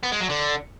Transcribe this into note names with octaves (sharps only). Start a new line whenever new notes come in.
B3
G#3
F#3
D3